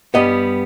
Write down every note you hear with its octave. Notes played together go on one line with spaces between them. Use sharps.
G2 G3 B3 D#5